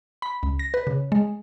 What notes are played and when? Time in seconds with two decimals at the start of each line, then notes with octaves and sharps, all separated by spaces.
0.22 B5
0.43 C#2
0.59 A#6
0.74 B4
0.87 C#3
1.12 G#3